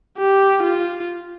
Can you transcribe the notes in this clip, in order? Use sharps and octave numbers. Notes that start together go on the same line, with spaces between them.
G4
F4